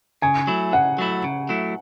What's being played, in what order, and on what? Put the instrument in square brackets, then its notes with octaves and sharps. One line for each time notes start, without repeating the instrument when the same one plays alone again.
[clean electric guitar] C#3 [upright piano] G#5
[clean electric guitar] F#3 A3 E4
[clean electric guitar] C#3 [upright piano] F#5
[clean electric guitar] F#3 A3 E4
C#3
F#3 A3 E4